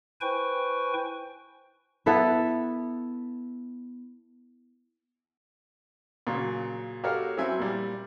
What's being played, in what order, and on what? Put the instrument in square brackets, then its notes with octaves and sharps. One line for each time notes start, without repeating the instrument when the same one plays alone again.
[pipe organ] E4 B4 C5 G5 G#5 C#6
[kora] B3 E4 A4 B4
[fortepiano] A#2 C#3 F#3
F#4 G4 A4 A#4 C#5 F5
F#3 C4 E4 E5 G#5
A#2 G3